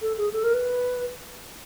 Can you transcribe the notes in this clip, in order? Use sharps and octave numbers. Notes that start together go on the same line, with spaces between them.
A4
G#4
A4
A#4
B4